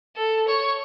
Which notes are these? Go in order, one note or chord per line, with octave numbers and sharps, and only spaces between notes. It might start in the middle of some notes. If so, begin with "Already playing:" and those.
A4
C#5